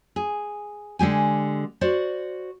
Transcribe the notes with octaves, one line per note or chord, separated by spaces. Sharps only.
G#4
D3 G#3 G4 G#5
F#4 C5 D5